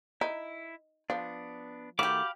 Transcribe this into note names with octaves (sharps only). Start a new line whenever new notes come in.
D#4 E4
F3 B3 D4
D#3 A3 F#4 G4 F5 B5 D6